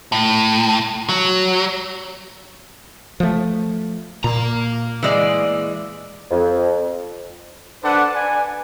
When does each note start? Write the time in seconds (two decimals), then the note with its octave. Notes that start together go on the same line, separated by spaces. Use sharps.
0.12 A2
1.09 F#3
3.20 F3 A3
4.24 A#2 A#3 A#5
5.03 E3 G#3 D5
6.31 F2
7.83 D4 A4 B4 C5 F#5
8.15 B4 D5 G#5